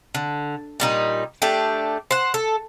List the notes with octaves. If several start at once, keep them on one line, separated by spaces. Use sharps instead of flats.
D3
A#2 G3 D#4
A3 D4 G4
C5 F#5
A4